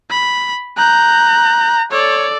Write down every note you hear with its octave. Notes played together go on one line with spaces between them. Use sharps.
B5
A#5 F#6 G6
A4 C#5 D5